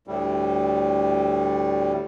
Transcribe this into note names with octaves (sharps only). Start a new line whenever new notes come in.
D2 A2 G3